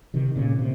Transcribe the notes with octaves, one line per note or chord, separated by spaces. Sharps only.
C3 D#3
A#2 C#3
C3